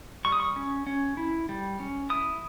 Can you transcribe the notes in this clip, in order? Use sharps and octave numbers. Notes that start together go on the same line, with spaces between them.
G3 C#6
D#6
C#6
C#4
C#4
E4
G3
C#4
E4 D#6